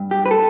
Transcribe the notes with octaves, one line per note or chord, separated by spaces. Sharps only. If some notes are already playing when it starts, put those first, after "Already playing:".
Already playing: G2
G4
B4
A4